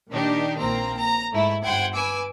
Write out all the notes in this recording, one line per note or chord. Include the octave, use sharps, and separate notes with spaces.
A#2 D#3 D4 D#4 G4
A#1 A#3 C4 A#5
A#5
G#2 A3 E4
G1 C5 F#5 G5 G#6
B4 G#5 D6 E6